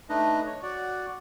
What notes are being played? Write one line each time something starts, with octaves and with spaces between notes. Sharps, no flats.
A3 D4 D#4 B4 D#5
C#5
F#4 D5 F#5